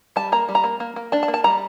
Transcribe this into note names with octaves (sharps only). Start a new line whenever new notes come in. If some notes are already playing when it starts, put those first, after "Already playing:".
G3 A5
A#3 A#5
G3
A#5
A#3
A#3
A#3
D4 A5
A5
A#3
A5
G3 A#5